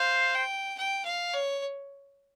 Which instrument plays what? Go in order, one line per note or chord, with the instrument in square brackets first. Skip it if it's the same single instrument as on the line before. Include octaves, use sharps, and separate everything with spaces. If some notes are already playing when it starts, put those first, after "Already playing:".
Already playing: [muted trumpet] C5 [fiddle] F5
[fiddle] G5
G5
F5
C#5